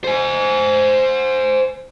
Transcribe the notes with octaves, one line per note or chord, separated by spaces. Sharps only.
C5 G#5